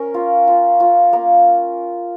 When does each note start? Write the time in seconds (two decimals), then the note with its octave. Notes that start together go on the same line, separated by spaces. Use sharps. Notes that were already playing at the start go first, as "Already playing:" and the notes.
Already playing: C#4 A#4
0.14 F4
0.47 F4
0.80 F4
1.13 A#3